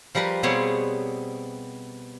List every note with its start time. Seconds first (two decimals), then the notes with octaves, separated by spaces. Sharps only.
0.15 F3 G3 A#4 B4
0.43 B2 G3 B3 C4 G#4 C#5